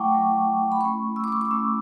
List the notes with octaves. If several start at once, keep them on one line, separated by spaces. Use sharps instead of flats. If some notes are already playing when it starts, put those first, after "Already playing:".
Already playing: F#3 A3 E4 F#5 G5 A5 C#6 D6
F#3 A3 E4
B5
A3 C#4 E4 C#6
E6
D6
C#6
D6
A3 C#4 E4 E6